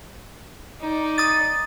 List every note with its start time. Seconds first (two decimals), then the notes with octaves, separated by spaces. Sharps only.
0.81 D#4 D5
1.18 D#6 A6